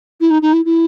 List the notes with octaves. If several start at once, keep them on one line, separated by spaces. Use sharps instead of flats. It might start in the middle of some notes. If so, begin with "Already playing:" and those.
E4
D#4
D#4
E4
E4